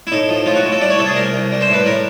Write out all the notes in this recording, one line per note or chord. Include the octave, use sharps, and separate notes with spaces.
E4
A2 D#4
F3
A2 F4
F#4
A2
A4
G3 D5
C#5
C2 A4
G#4
C2 A#4
C2
G3
C5
A2 B4
A2 A#4